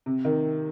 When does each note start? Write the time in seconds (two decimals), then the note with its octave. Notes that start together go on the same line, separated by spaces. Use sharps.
0.06 C3
0.25 D#3